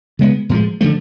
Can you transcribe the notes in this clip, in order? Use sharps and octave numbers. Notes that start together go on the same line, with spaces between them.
C#3 G#3 B3
A2 F3 G#3
D3 F3 A3